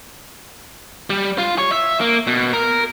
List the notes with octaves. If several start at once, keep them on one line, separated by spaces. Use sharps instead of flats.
G3
F4
C#5
E5
A#3
B2
A#4